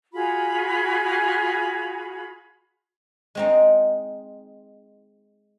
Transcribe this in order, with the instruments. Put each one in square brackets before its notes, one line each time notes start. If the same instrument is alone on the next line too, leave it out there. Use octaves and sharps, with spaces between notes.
[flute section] F4 F#4 G#4 B5
[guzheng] G#3 C4 D#4